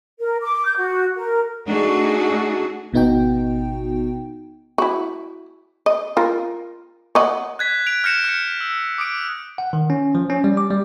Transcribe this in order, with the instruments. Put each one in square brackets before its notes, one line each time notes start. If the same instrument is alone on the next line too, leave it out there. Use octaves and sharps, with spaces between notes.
[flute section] A#4
D6
G6
F#4
A#4
[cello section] A3 D4 D#4 F#4 G#4
[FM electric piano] G#1 B2 B3 D#4 F#4 G5
[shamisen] E4 F#4
D#5
F4 A#4
C#5 D#5 F#5
[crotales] F#6 G#6 B6
F#6 D7 F7
F6 G6 A#6 C#7 E7
F6 C#7
E6
D6 D#6 D7
[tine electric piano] F#5
D#3
C#4
F3
C#4
G3
D6
G3